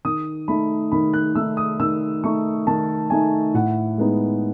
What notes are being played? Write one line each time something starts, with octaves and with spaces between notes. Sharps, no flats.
D#3 D#6
A3 D#4 B5
D#3 B5
F#6
A3 D#4 E6
D#6
D#3 E6
A3 D#4 C#6
D#3 A5
A3 D#4 G#5
A2 F#5
G#3 B3 D#4